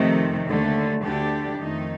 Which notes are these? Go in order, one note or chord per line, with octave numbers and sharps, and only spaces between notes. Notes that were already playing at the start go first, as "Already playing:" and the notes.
Already playing: F2 C3 D#3 A3
D#2 D3 A3
D2 D3 A3 D4 G4
F2 D#3 A3 D#4